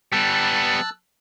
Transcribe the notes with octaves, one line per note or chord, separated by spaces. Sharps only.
G3 B3 A5 E6 F#6